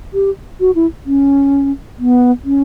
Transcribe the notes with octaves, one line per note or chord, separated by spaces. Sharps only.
G4
F#4
E4
C#4
B3
C#4